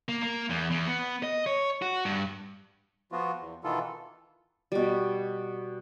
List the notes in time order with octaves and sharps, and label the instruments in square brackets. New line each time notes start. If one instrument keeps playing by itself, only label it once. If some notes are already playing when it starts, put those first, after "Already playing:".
[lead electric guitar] A#3
A#3
E2
E2
B3
D#5
C#5
F#4
G2
[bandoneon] F3 B3 F4 F#4
E2
B2 D#3 E3 B3 F4 A4
[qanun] B2 G3